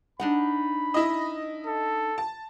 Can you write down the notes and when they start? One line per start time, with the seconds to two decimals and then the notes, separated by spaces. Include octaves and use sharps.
0.20 D4 D#4 F#5 B5
0.94 E4 D#5
1.66 A4
2.18 A5